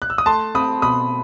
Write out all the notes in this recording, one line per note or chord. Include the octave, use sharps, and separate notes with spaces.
F#6
E6
D#6
A3 A5 C6
C4 B5 D#6
B2 B5 D#6